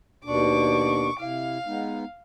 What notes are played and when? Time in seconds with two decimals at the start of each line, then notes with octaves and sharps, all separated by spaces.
0.25 D#2 B2 D4 C#6 D6
1.19 C3 E4 F5
1.67 G#3 B3 D#4